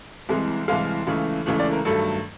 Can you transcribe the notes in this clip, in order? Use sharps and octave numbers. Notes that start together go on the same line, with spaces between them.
C2 C3 E3 G#3
C2 C3 E3 G#3 F5
C#2 C#3 E3 A3
C#2 C#3 E3 A3
D5
A#4
G2 D#3 F#3 A3 A4